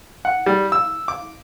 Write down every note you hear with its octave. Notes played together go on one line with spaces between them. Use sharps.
F#5
G3
E6
D6